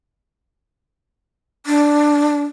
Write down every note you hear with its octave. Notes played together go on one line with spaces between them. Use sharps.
D4